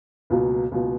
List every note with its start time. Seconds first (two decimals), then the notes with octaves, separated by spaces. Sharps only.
0.30 C#2 B2 F#3 A#3
0.71 C#2 B2 F#3 A#3